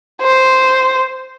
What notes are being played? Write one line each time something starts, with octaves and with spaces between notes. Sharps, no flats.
C5